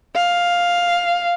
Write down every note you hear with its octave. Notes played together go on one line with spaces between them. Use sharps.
F5